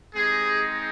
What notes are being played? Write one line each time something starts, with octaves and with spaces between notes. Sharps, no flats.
G#3 C4 D#4 G4 G#4